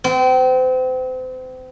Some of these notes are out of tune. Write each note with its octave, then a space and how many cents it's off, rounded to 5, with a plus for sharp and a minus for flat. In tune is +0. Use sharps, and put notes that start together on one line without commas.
C4 -35